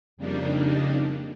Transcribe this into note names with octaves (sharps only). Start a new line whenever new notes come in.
F2 C#3 G3 A#3 D4 D#4